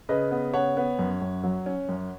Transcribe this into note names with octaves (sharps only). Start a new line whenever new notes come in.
C#3 B4 D#5
B3
C#3 C#5 F#5
B3
F#2
F#2
F#3
C#4
F#2